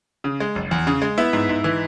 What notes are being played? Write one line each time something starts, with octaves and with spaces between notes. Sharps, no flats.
C#3
G#3
F#1
E2
C#3
G#3
B3 E4 E5
G#2
G#2
E3